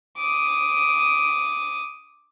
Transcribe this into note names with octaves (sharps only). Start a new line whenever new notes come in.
D6 D#6